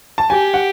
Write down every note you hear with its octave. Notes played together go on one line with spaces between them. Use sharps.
A5
G4 G#5
F#5